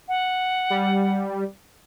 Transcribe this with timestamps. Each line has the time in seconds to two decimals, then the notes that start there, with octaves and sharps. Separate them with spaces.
0.08 F#5
0.70 G3